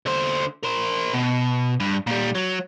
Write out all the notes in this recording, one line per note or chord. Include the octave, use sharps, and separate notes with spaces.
D3 C5
A#4 C5
B2
G2
A#2 G3
F#3